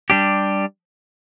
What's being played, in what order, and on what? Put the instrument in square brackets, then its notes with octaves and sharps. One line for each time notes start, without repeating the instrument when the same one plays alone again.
[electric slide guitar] G3 D4 G4